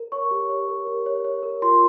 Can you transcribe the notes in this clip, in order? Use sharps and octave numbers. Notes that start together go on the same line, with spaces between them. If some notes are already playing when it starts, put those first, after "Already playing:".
Already playing: A#4
C#5 C#6
G4
C#5
A#4
G4
C#5
C#5
A#4
F4 C6